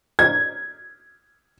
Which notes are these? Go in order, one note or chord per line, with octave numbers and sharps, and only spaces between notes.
G#6